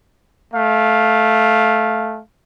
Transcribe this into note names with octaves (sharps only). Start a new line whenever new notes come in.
A3 F5